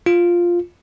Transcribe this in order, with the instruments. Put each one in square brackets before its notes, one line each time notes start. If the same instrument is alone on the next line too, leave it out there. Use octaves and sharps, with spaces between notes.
[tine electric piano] F4